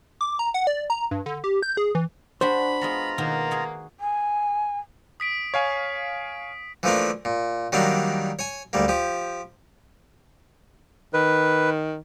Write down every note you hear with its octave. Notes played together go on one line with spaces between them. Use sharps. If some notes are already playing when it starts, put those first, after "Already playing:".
D6
A#5
F#5
D5
A#5
G2
D3
G4
G6
G#4
E3
D4 F#4 G4 C5 B5
G#3 B3 F4 F#4 A#5
B2 D#3 A#3 B3
F#4 G#4 A#4
G#5
D#6 B6 D7
C#5 F5 G#5
E3 F3 A3 A#3 D4
A#2
D#3 F#3 G3 A#3 D4
C#5 G#5
D2 G3 A#3
F3 G4
D#3 B4